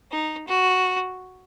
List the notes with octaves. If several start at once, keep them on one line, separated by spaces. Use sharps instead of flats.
D#4
F#4